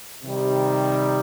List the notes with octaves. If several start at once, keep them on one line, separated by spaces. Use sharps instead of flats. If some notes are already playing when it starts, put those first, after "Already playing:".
C3 D#3 G3